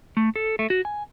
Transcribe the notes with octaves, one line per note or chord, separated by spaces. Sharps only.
A3
A4
A3
F#4
G#5